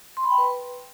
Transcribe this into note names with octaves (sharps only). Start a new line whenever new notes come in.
C6
B5
G5
B4